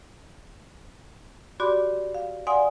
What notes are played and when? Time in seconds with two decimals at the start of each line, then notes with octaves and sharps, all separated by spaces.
1.60 F#4 G4 D5 B5 C6 D6
2.14 F5
2.47 D5 F5 F#5 G#5 C6 D#6